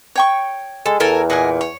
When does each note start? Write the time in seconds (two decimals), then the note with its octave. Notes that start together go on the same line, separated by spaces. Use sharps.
0.15 C#5 G5 C#6
0.86 G#3 A4
1.00 E2 A4 A#4 G#5
1.30 A#2 D#5 F#5 G#5
1.61 C#5